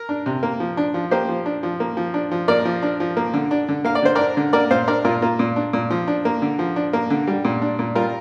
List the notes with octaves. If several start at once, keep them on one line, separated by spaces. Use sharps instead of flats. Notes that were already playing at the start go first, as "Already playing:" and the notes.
Already playing: A#4
D4
C3
A#3
F3
D4
F3
A#3 G4 C5
F3
D4
F3
A#3
F3
D4
F3
A#3 A#4 D5
F3
D4
F3
A#3
D3
D4
D3
A#3 F5
D5
D3 C5
D4 A#4 D5
D3
A#3 A#4 D5
A#2 C5 F5
D4 A#4 D5
A#2 F4 A#4
A#3 F4
A#2
D4
A#2
F3
D4
A#3
D3
F3
D4
A#3
D3
G3
A#2
D4
A#2
G3 F4 A#4